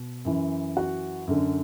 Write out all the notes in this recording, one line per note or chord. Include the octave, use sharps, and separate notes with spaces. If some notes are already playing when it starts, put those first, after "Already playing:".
Already playing: B2
F#2 E3
F#4 F#5
F#2 D3